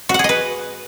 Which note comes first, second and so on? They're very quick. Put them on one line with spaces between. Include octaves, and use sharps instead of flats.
F#4 F#5 G#4 D#5 B4